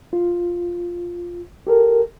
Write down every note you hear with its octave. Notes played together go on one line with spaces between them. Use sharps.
F4
G4 A4 A#4